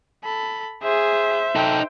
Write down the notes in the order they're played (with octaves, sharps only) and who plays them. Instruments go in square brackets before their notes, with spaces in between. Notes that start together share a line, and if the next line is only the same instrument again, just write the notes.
[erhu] A4 [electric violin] B5
[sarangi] G#4 [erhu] C5 [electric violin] E5
[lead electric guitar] D#4 A4 [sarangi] G5